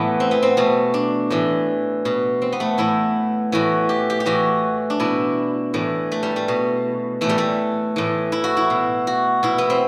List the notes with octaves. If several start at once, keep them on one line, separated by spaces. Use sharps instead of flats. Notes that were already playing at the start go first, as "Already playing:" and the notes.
Already playing: A2 E3 A3 B3
C4
B3
C4
B2 A3
D4
A2 E3
B2
C4
B3
A3
A2 E3 E4
A2 E3 F#4
G4
G4
G4
A2 E3 F#4
D4
B2 E4
A2 E3
A3
G3
A3
B2
A2 E3 A3
G3
A3
A2 E3
E4
F#4
E4
B2
F#4
B2 E4
B3
C4